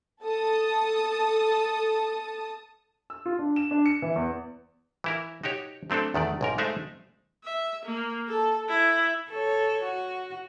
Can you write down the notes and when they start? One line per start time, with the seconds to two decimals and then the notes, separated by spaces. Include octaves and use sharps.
0.22 A4 A5 D#6
3.10 E6
3.26 F4
3.39 D4
3.56 E7
3.71 D4
3.86 C#7
4.02 E3
4.16 E2
5.04 E3 E4 A#4
5.43 D#4 F#4 G4 C#5
5.90 F#3 A3 C4 D4 A4
6.14 E2 D#3 A3 D5
6.41 B1 G#2 A#4
6.58 G#3 A3 D#4 C5 D5 E5
7.44 E5
7.86 A#3
8.28 A4
8.69 E4
9.29 A4 C#5
9.84 F#4